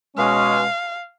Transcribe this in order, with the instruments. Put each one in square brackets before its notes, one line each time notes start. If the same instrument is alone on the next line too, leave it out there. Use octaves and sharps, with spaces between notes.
[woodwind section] B2 G#3 C#4 [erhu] F5